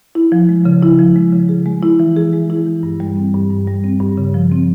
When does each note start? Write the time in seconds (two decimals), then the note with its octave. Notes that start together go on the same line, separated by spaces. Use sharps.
0.15 E4
0.32 F3
0.49 G#3
0.65 C#3
0.83 E4
0.99 F3
1.16 G#3
1.33 C#3
1.49 G#4
1.66 G#3
1.83 E4
2.00 E3
2.16 G#4
2.33 G#3
2.50 E4
2.67 E3
2.83 G2
3.00 G3
3.17 C4
3.34 G2
3.50 G2
3.67 G3
3.84 C4
4.01 G2
4.18 C#3
4.34 F3
4.52 C4